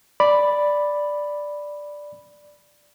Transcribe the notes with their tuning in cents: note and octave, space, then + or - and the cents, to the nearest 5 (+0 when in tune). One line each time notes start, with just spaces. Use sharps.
D5 +0 B5 +0